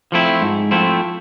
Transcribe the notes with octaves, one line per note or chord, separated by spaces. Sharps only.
F3 A3 C4 E4
G#2
F3 A3 C4 E4